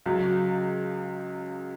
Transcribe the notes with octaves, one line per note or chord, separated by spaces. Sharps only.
C#2 C#3 F#3